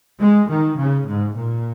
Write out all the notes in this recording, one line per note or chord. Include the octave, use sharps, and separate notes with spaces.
G#3
D#3
C#3
G#2
A#2